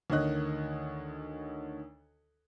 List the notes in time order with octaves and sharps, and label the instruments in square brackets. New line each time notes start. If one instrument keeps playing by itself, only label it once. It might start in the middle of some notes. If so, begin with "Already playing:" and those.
[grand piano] D2 D#3 C#5 D#5 F#6